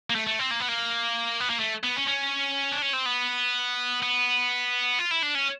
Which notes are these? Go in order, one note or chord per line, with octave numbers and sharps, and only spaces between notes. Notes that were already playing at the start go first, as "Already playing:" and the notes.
A#3
A3
A3
C4
A#3
B3
A#3
B3
A#3
A3
B3
C#4
C#4
D4
C#4
C4
B3
B3
F4
E4
D4
C#4